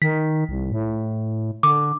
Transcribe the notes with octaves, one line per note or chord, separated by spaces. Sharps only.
D#3 B6
C2
A2
D3 D6